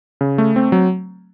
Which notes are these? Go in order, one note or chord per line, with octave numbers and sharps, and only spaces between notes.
C#3
A3
C4
F#3